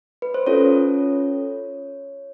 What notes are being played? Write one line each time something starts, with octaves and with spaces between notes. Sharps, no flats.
B4
C5
C#4 F4 A4 C#5